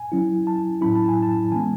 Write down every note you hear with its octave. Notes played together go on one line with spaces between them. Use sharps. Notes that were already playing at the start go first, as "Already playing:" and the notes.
Already playing: G#5
F#3 C#4 E4
A5
A2 F#3 C#4 E4 B5
A5
G#5
A5
E3 G#3 B3 G#5